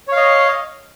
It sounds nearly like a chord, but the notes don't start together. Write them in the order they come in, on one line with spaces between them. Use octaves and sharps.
C#5 F5 D#5